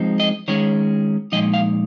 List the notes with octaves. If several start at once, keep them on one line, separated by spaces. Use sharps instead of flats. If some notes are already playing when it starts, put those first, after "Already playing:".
Already playing: F3 G#3 C4 D#4
D#5
D#3 G#3 C#4 C#5
A#2 F3 G#3 D#4 D#5
F5